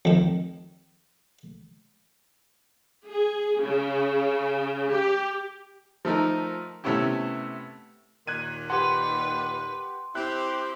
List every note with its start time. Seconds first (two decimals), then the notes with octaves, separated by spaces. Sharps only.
0.05 F2 D#3
3.09 G#4
3.62 C#3
4.91 G4
6.05 F3 A3 D#4 A#4
6.84 C3 A3 B3 C#4 E4 G4
8.27 D#2 A#2 D#3 F#6 G#6 D#7
8.70 G4 B4 F#5 C6
10.15 C4 E4 G4 F#6